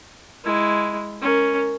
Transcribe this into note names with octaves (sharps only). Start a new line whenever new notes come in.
G#3 E4
C#4 A#4